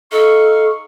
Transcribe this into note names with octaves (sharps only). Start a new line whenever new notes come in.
D#4 A4 F5 C#6